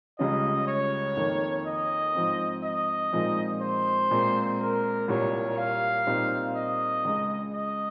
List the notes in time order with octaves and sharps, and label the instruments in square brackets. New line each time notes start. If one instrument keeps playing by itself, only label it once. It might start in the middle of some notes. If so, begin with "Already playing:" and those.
[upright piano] C#2 C#3 G3 C#4 F4 [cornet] D#5
[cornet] C#5
[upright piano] F2 D#3 A#3
[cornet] D#5
[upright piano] G#2 F3 C4
[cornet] D#5
[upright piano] A#2 F3 G#3 C4 D#4
[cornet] C5
[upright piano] A#2 G#3 C4
[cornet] A#4
[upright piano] C2 A#2 G3 [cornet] C#5
[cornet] F5
[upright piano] A#2 G3 C4 D#4
[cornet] D#5
[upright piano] C#2 C#3 G#3
[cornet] D#5